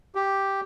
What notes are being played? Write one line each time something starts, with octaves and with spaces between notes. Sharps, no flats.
G4